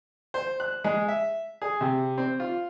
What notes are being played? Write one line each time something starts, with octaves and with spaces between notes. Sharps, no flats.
C5
F#6
G#3
E5
G#4
C3
C4
F4